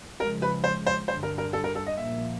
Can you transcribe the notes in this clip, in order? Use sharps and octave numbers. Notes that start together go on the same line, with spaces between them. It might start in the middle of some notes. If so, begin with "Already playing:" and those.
C#3 F3 G#3 A#4
B4
C5
C5
G2 D3 G3 C5
A#4
A#4
A4
A#4
A4
D#5
A#2 F3 A#3 E5